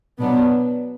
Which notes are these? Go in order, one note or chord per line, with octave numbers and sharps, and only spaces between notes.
B2 F#3 B3 D4